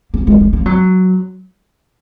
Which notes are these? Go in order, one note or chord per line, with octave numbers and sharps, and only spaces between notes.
A#3
G#3
G#3
A#3
F#3